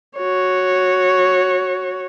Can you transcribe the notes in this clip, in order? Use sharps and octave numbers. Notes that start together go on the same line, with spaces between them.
F#4 C#5